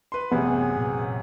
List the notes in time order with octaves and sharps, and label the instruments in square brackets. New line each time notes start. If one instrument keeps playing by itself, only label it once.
[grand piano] B4 C6
[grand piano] A1 F#2 C3 [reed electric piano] B3 [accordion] G#4 F#5
[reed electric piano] A#2